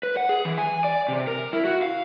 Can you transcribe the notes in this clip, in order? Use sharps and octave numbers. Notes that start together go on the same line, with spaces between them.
B4
F#5
G#4
E3
G#5
D5
C3
A#4
E4
F#4
F5